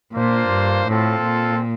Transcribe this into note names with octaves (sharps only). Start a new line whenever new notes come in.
A#2 A#3 D4 F4 C5
G2
A2 C4 F4 A4
A#2